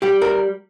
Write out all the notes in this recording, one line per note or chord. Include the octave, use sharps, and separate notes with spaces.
G3 G4
A#4